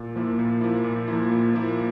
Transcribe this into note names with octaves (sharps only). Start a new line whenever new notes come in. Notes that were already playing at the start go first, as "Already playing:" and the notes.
Already playing: A#2
F3 A#3 E4
A#2
F3 A#3 E4
A#2
F3 A#3 E4
A#2
F3 A#3 E4